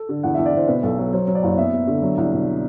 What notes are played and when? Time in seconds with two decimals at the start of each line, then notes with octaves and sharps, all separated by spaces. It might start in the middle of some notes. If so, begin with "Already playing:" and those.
Already playing: A4
0.09 D3
0.23 E2 F#5
0.34 E2 E5
0.46 D5
0.53 E2 C5
0.68 B2 B4
0.83 B1 A4
0.98 F#3 A4
1.13 F#3 C5
1.28 F#3
1.35 D5
1.43 F#1
1.57 B3 E5
1.73 B3
1.87 D3
2.02 F#3
2.17 C2
2.32 B2